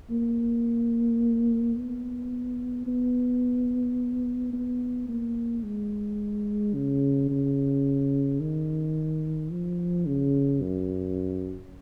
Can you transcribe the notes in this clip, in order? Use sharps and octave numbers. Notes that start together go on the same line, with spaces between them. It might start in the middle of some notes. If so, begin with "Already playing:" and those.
A#3
B3
B3
B3
A#3
G#3
C#3
C#3
D#3
F3
C#3
F#2